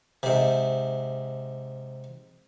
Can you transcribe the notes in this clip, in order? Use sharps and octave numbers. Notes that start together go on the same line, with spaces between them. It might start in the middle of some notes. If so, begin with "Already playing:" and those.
G#2 C3